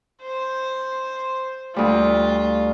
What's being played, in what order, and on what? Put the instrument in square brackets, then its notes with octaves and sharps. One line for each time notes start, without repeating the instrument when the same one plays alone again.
[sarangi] C5
[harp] D2 G3 [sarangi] F4